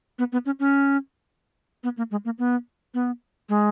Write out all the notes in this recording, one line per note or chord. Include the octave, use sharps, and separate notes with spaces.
B3
B3
C#4
C#4
B3
A#3
G#3
A#3
B3
B3
G#3